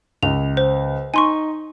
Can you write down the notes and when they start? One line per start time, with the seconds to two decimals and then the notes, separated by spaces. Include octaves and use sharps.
0.23 C#2 F7
0.57 C5
1.14 D#4 G#5 C6 C#6